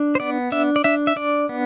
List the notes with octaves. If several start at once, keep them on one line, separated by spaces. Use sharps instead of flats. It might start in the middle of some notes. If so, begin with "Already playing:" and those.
Already playing: D4
C5
B3 D5
D4 E5
D5
D4 E5
E5
D4 D5
B3